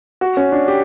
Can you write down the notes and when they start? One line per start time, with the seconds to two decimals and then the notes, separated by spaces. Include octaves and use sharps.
0.21 F#4
0.37 C#4
0.52 D4
0.68 G4